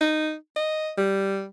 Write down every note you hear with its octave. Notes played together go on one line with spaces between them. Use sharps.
D#4
D#5
G3